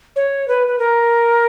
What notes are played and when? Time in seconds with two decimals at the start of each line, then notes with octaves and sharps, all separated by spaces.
0.16 C#5
0.48 B4
0.68 B4
0.79 A#4